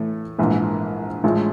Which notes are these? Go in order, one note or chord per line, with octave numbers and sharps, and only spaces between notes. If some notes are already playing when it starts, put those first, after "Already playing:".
Already playing: A2 E3 A3
A#1 G#2 E3
A1 A2 F3 G#3